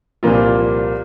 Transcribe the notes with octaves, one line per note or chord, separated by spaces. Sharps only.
C2 A#2 F3 A#3 F4